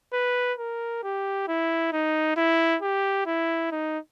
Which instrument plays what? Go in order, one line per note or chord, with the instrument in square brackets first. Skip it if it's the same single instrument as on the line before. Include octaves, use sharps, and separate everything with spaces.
[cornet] B4
A#4
G4
E4
D#4
E4
G4
E4
D#4